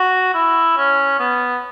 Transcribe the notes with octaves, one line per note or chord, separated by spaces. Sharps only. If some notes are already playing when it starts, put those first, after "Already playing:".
Already playing: F#4
E4
C#4
B3